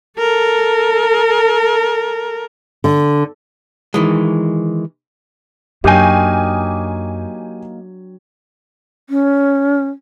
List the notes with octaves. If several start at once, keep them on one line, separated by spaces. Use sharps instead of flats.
A4 A#4
D3
D#3 E3 G#3
F#2 F#3 A#3 D4 D#4 G4 G5 G#5
C#4